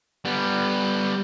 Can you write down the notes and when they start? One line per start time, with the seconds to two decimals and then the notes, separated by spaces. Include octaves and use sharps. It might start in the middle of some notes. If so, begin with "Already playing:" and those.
0.25 G3 B3